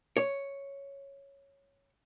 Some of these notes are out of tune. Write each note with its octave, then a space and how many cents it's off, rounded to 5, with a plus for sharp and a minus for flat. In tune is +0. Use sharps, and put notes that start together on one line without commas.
C#5 +0